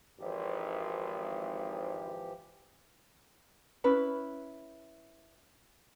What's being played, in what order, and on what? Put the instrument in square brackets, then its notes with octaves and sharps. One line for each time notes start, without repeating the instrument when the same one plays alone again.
[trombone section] G#1 [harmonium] E3 F3 G4
[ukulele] C#4 E4 B4 B5